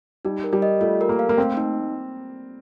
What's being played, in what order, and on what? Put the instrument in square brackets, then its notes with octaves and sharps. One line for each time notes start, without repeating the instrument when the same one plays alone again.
[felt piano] G3 [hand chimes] D#4
[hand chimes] A#4
[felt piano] G3
[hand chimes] D#5
[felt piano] A3 [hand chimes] F4
[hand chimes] A#4
[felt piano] A#3
[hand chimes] F5
[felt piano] A#3
[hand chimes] A3 [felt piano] C4
[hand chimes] D#4